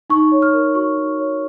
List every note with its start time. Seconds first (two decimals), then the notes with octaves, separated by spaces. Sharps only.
0.10 D#4 C#6
0.32 C#5
0.42 F6
0.53 A#4
0.75 F#4 C#6
0.97 D#4
1.19 C#5